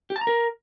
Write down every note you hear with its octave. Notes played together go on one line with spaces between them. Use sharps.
G4
A5
A#5
A#4